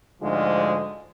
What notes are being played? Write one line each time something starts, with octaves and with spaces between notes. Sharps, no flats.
D2 G#2 F3 G#3